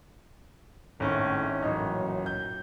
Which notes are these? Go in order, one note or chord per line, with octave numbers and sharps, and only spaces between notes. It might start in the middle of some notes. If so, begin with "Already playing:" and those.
G#1 A2 C#4
A1 F#2 A#2 F#3 D#4
G6